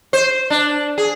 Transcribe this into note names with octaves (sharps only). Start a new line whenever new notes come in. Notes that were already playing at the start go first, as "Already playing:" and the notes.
C5
D4
G#4